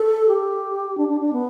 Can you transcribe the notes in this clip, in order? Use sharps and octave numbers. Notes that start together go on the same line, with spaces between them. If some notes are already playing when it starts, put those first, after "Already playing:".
Already playing: A4
G4
D4
D4
D4
B3